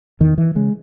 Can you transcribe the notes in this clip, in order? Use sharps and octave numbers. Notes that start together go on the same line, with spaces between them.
E2 D#3
E3
C#3 G#3